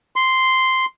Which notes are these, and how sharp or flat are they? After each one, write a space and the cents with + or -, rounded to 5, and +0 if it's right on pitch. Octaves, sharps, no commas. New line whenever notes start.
C6 -5